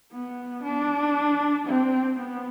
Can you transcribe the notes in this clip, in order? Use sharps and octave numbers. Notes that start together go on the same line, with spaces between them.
B3
D4
C4
B3